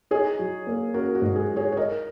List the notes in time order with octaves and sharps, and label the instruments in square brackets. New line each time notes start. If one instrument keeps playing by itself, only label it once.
[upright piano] D#4 [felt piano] G#4 C#5
[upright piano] F#3
A#3
[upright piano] C#4 [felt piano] F#4 A#4
[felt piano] F#4
[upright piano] G#2
[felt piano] G#4
[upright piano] F#3
[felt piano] G#4 C#5
C#5
[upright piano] D#4 [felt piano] A#4 D#5